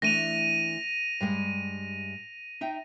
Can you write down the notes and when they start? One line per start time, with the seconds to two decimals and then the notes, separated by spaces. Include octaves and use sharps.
0.02 E3 A3 D4 A#6 D#7 F7
1.21 G2 G3 G#3
2.61 D#4 E5 G5